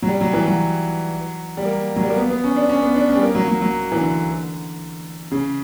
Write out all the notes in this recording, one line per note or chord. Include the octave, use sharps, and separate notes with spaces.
F#3
G3
F#3
E3
F#3
G3
A#3
F#3
G3
A#3
B3
B3
C#4
D4
C#4
B3
D4
C#4
G3
A#3
F#3
F#3
F#3
E3
D3
C#3